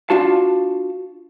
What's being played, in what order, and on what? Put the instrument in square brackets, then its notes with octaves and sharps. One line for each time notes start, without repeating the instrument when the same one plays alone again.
[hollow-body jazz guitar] D4 F4 F#4 A5